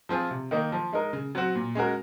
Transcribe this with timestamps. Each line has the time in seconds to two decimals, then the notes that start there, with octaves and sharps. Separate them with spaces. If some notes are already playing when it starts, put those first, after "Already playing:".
0.09 F3 C4 F4 G#4
0.31 C3
0.51 D#3 A#3 D#4
0.72 F3
0.93 G#3 D#4 A#4
1.13 C#3
1.35 F#3 C4 F#4
1.56 A#2
1.75 G#3 C#4 F#4 A#4